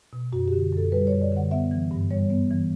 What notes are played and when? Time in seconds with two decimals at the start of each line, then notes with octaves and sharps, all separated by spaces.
0.13 B2
0.33 F#2 F#4
0.48 D3 G4
0.72 F#2 A4
0.92 G3 B4
1.07 F#2 C#5
1.22 D5
1.32 D3 F#5
1.51 B3 E5
1.71 E3
1.91 G2
2.10 G3 C#5
2.30 B3
2.51 E3